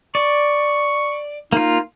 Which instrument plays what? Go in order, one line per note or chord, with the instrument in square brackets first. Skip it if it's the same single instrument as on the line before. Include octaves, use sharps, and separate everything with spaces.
[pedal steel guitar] D5 [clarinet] C#6
[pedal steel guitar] A#3 F4 [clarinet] D#4